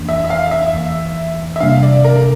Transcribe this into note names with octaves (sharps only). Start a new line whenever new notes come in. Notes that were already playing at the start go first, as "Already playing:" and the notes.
Already playing: F2 E3 A#3 D4
E5
E5
F5
E5
E2 E3 A#3
E5
C3 G3 A#3 D4 F5
D5
A#4